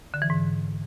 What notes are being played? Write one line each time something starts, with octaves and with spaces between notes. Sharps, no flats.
D3
E3
G#2